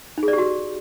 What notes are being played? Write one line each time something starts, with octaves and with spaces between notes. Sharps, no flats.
D#4
G#4
D5
G4
F#4